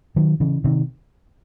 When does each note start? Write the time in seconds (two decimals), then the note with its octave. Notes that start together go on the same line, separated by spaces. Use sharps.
0.16 D#3 F#3
0.40 C#3 E3
0.64 C3 D#3